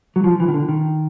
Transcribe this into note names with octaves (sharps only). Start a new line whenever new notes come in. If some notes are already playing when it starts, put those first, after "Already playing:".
F#3
F3
E3
D#3
D3
D#3